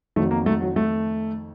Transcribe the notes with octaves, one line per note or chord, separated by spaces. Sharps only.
F2 D#3 F#3 A3
A#3
A3
F#3
A3